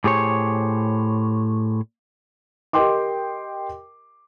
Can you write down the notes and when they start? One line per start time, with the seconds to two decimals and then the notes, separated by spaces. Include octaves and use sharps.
0.04 A2 G4 G#4 C5 C#5
2.73 G4 A#4 D#5 G5 C6 D6